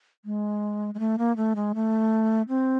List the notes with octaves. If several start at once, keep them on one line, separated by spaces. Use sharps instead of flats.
G#3
G#3
A3
A#3
A3
G#3
A3
C4